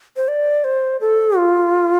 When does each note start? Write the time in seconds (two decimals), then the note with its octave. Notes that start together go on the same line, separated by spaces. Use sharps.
0.16 C5
0.28 D5
0.64 C5
1.01 A4
1.37 F4